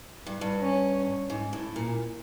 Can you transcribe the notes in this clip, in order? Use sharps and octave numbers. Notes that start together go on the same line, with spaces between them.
G2
G2
C#4
G#2
A2
A#2